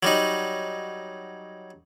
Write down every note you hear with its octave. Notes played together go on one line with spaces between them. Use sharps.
F#3 G3 D#4